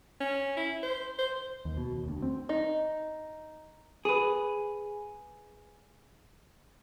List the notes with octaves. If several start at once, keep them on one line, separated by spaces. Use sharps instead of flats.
C#4
E4
C5
C5
D#2
B2
D#2
D2
C4
D#4
G#4 B4